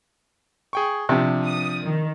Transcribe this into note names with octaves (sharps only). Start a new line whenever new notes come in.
G#4 G5 C#6
C3 F3 D4
D#6
D#3